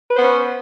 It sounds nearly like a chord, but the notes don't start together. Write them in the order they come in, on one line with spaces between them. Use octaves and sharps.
B4 C5 B3 C#4